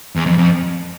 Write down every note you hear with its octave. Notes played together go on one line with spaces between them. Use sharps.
E2
F2
F2